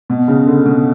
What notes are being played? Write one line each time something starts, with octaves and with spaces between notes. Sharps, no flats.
B2
C#3
D3
B2